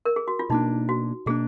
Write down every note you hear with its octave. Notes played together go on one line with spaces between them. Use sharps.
A#4
G#4
F#4
F4
B2 A#3 D4 D#4
F#4
B2 A#3 D4 G#4